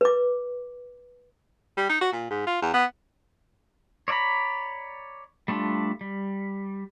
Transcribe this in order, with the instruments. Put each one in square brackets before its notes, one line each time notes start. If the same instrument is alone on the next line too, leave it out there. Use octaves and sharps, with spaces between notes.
[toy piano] B4 D6
[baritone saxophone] G3
D#4
F#4
A#2
G#2
F4
E2
B3
[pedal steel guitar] C#5 D5 E5 A#5 B5
G3 A3 D4 F4
G3